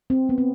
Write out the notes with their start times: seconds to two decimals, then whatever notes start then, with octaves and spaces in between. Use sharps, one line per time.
0.10 C4
0.29 B3
0.38 C4